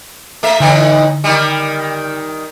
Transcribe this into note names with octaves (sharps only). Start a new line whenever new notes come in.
A3 E5
A2 D3 E3 D#4
D#3 G3